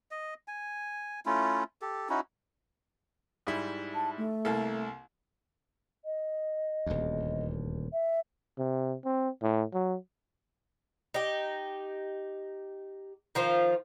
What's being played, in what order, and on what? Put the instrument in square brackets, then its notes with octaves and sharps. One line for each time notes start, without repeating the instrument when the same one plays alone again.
[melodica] D#5
G#5
A3 C#4 E4 F4
G4 A4
C#4 D#4 E4 F#4
[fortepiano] G#2 G3 E4
[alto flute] A5
A3
[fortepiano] C2 A#3 A4
[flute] D#5
[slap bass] D#1 D2
[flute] E5
[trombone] C3
C4
A2
F#3
[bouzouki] D#4 G4
D#3 F3 F4 C5